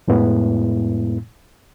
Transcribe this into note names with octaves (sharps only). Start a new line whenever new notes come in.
F2 A2 G#3 B3 E4